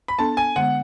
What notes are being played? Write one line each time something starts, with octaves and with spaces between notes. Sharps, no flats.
B5
B3 D4 A4 A5
G#5
D3 G#3 B3 F#5